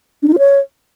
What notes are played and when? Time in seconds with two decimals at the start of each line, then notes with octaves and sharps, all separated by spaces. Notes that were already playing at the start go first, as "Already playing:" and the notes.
0.23 D4
0.28 D#4
0.33 F4
0.38 C#5